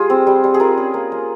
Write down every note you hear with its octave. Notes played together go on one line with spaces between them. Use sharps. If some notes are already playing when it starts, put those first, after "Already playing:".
Already playing: G3 F4 G#4
C4
G3
G3
G#4
F4 A#4
C#4
A#3
A#3